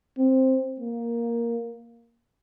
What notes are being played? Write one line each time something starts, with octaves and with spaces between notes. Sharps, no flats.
C4
A#3